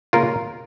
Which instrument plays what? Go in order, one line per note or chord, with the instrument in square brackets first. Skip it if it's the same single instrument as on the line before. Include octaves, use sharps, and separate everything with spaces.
[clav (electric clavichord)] C#3 A#3 C#4 F4 A#4